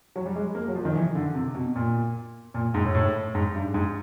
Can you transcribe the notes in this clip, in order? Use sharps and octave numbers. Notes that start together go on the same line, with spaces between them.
F#3
G3
G#3
A#3
F#3
F3
D#3
E3
D3
C3
B2
A#2
A#2
G#2
A2
A2
G#2
G2
G#2